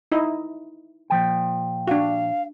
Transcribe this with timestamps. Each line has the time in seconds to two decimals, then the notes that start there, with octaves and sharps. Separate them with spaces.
0.12 D#4 E4 D#5
1.10 A#2 F3 G5
1.87 D4 F#4 F5